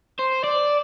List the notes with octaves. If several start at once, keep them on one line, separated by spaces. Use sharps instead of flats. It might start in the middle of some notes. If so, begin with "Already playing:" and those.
C5
D5